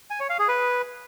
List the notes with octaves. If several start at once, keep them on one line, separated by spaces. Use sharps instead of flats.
G#5
C#5
F5
G#4
B4